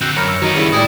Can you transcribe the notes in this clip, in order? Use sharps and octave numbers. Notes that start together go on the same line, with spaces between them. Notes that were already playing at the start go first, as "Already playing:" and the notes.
D3 C4 F#4 G5 E6
F#2 A#4 C#5 A#5 B5 F6
E6
D#3 F#3 B3 D#4
G2 C#3 E4
A2 G#3 E4 D5 G5 D#6